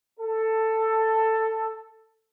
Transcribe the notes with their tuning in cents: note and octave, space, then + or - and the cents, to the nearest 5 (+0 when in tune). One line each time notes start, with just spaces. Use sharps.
A4 +10